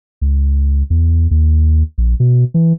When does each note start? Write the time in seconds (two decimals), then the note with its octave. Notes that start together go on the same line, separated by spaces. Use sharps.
0.21 C#2
0.90 E2
1.31 D#2
1.98 A#1
2.20 B2
2.54 E3